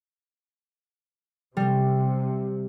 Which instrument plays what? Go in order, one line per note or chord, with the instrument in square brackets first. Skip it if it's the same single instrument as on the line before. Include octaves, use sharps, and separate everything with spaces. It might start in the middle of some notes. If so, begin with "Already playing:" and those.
[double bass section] C3 [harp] G3